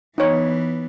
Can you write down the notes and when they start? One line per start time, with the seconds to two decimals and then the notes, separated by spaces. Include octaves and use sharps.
0.18 E3 B3 D#4 C#5